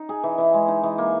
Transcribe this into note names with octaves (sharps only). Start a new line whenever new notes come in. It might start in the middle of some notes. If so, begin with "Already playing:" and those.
Already playing: D#4
G#4
E3
E3
G#3
D#4
E3
A#3